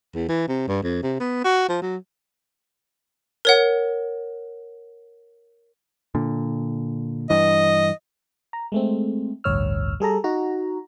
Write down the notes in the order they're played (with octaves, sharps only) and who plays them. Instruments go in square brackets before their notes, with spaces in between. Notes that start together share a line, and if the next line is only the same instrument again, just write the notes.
[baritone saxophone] E2
E3
C3
G2
F2
C3
B3
F#4
F3
F#3
[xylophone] A#4 C#5 F#5
[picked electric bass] A#2 D3
[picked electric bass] G2 E3 [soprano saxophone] D#5
[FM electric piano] A#5
G#3 A3 C4
A1 D2 G2 C#5 E6 F6
G3 G#4 A4 A#5
D#4 F#4 A#5